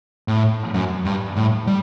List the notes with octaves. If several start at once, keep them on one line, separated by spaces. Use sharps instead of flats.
A2
F#2
G2
A2
G3